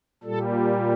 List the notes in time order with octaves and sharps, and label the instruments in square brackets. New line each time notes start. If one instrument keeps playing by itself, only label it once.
[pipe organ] A#2 G3 A4